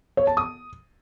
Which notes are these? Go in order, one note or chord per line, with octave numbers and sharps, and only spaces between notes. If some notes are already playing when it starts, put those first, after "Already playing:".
C#5
A5
D#6